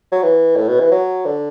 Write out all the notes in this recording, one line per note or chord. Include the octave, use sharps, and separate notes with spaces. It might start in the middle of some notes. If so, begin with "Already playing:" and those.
F#3
E3
A2
B2
E3
F#3
D3